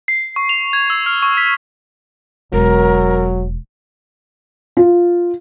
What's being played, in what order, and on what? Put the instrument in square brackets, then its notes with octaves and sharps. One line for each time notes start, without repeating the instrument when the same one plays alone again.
[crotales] C7
C#6
F7
G#6
E6
F6
C#6
B6
[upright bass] E1 [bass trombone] F#3 [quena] A#4
[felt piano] F4